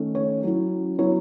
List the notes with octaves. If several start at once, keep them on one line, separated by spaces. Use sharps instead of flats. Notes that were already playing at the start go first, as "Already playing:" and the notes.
Already playing: D#3 A3 C#4
C#5
F#3 C#4 E4
F#3 B3 E4 C#5